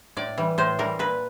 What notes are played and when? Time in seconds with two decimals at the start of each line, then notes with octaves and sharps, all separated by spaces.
0.17 A2 D5
0.38 E3 G3
0.58 A2 C5
0.79 E3 G3 A#4
0.99 A#2 B4